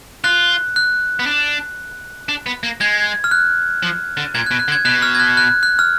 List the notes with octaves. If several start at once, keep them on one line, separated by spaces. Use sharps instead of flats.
F4 F#6
F#6
B3
D4
D4
B3
A#3
G#3 G#6
F6
F#6
F3
D3
A#2 G#6
F#6
B2
F#6
D3
G#6
B2 F#6
F6
G#6
F#6
F#6
F#6
F6